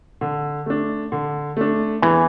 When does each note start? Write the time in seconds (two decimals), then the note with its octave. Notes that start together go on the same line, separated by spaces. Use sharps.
0.21 D3
0.66 A3 D4
1.12 D3
1.57 A3 D4
2.02 E2 E3